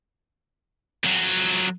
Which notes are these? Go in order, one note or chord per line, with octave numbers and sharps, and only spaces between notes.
F2 F#3